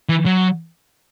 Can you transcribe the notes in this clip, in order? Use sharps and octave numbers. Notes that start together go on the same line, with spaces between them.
E3
F#3